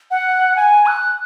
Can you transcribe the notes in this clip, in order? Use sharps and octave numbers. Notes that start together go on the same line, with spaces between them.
F#5
G#5
F#6